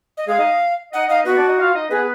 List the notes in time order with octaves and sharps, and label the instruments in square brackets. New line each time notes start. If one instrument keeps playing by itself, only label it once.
[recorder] D#5
[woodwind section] G#3 G#4 [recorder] F5
[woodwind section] D#4 D#5
[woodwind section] D#4 D#5 [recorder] F#5
[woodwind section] D#4 D#5 [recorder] F5
[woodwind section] B3 B4 [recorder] F#4
[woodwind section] D4 D5
D#4 D#5
F4 F5
D#4 D#5
[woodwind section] B3 B4 [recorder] G#4